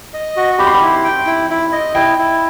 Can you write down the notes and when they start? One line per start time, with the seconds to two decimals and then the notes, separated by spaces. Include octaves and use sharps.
0.13 D#5
0.36 F#4
0.59 G4 B5
0.67 C6
0.74 B5
0.82 E4
1.04 G5
1.27 E4
1.50 E4
1.72 D#5
1.95 E4 G5
2.18 E4